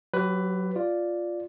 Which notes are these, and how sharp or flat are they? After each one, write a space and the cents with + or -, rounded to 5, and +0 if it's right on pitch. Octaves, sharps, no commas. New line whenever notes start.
F#3 +0 G4 -30 B4 +15
F4 +0 D5 +0